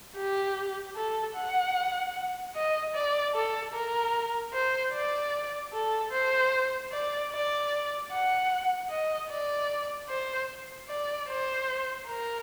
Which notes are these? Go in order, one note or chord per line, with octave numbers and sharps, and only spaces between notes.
G4
A4
F#5
D#5
D5
A4
A#4
C5
D5
A4
C5
D5
D5
F#5
D#5
D5
C5
D5
C5
A#4